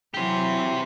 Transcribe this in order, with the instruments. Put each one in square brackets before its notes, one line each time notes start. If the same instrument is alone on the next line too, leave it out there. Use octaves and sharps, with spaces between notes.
[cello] E3 F#3 [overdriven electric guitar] G4 C5